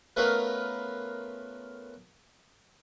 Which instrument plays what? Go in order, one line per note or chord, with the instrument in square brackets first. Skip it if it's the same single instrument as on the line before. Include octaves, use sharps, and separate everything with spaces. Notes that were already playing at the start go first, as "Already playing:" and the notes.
[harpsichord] A3 B3 C#4 F4 A#4 B4